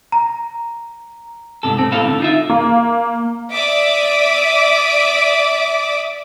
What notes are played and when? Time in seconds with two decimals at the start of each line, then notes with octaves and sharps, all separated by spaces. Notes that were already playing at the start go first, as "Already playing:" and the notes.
0.12 A#5
1.63 G#2 C3 A4
1.78 A3 C4
1.91 A2 C4 A4 F5
2.05 D3
2.20 D#4 F4 E5
2.50 A#3
3.53 D5 E5 D6 D#6